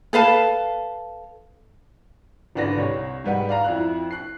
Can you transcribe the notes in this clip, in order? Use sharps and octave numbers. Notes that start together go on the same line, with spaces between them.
A4 B4 F5 A5
G#1 D3 D4 B4 A#6
C2 C#5
G#2 G3 B4 F#5
D5 F5 A#5
F2 E4 F#6
F#6 C7